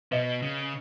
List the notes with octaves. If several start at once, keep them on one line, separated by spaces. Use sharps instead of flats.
B2 B4 D#5
C#3